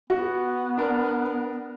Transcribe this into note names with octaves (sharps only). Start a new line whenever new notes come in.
B3 F#4
D4 A#4